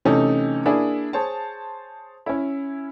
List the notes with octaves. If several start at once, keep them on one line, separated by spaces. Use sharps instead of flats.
C3 E3 A3 C#4 D#4 A4
A#3 D4 E4 G#4
G#4 C5 C#5 A5
C#4 E4